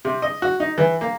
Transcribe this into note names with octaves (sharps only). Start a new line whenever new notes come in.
C3
D#5
F#4
D#4
E3
A#3